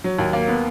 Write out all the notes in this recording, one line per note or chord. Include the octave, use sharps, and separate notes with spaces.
F#3
D#2
A#3
B3